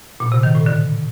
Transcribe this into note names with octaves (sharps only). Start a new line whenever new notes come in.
A#2
C3
D#3
A2
D3